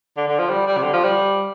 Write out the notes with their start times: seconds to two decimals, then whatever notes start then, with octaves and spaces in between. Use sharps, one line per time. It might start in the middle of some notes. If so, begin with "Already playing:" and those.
0.17 D3
0.28 D3
0.39 F3
0.50 G3
0.67 G3
0.77 C3
0.83 D3
0.93 F3
1.04 G3